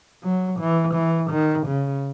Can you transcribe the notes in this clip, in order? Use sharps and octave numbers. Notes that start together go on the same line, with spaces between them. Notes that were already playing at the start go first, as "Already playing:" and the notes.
F#3
E3
E3
D#3
C#3